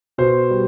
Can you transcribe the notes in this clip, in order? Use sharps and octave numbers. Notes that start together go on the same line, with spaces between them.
B2 C5
G3